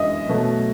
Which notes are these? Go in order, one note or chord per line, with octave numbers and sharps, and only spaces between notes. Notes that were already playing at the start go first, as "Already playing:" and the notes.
Already playing: F#2 E3 G#3 D#5 E5
B2 F#3 A3